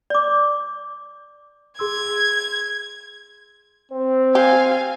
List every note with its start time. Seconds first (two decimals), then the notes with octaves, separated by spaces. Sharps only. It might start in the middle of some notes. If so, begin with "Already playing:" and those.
0.10 D5 D6
1.79 G#4 C6 E6 G#6
3.92 C4 C5
4.35 G4 F5 G#5